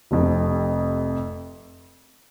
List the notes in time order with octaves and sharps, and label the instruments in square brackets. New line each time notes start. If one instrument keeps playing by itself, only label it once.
[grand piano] F1 F2 C3